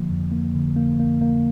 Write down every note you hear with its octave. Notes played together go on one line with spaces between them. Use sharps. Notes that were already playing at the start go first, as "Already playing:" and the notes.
Already playing: D3 F3 A#3
F2
A#3
D3
A#3
A#3
A#3